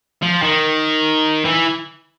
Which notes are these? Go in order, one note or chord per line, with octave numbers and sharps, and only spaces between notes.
F3
D#3
E3